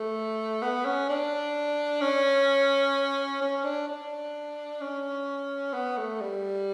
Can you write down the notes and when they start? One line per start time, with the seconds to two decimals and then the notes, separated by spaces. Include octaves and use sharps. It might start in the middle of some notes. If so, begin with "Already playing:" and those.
Already playing: A3
0.62 B3
0.85 C#4
1.09 D4
2.01 C#4
3.41 C#4
3.64 D4
3.88 D4
4.81 C#4
5.73 B3
5.97 A3
6.21 G3